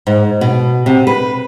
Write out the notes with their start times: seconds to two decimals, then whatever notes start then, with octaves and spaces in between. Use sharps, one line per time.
0.07 G#2
0.41 B2
0.86 C3
1.07 B4